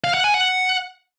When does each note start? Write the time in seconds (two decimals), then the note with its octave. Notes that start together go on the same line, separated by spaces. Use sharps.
0.04 F5
0.14 F#5
0.24 G#5
0.34 F#5